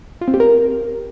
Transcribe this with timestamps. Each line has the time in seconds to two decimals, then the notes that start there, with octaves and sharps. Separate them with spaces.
0.21 F4
0.28 C4
0.34 G4
0.40 A#4